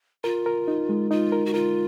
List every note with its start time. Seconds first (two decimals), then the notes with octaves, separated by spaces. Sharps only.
0.24 F4 A#4
0.46 A#4
0.68 D#4
0.89 G#3
1.11 D#4 F4
1.32 A#4
1.46 F#4
1.54 F4 A#4